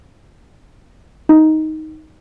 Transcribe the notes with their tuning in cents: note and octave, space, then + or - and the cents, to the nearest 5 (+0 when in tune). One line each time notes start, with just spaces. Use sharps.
D#4 +10